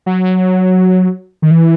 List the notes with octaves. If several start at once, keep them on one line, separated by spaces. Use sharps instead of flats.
F#3
D#3
E3